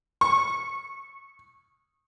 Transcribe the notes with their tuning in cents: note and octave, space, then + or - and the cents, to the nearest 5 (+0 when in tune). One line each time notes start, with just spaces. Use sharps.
C#6 -20